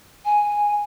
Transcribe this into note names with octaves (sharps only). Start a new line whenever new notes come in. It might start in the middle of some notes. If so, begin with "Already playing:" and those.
G#5